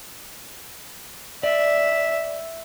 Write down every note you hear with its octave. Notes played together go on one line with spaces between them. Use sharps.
D5 E5